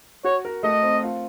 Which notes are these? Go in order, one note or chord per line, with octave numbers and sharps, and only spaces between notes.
F#4 C#5
A#4
A3 D#5
C4
F4